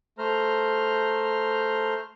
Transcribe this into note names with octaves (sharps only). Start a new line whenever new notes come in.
A3 C5 A#5 F6